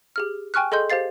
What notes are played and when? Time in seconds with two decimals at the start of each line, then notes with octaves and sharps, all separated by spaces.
0.16 G4 G#4 F6
0.54 G5 G#5 C#6 F6 F#6
0.72 G#4 A4 D#5 C6 G6
0.90 G4 C5 F5 A6 C7